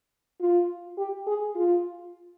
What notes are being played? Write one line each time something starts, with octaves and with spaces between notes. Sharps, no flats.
F4
G4
G#4
F4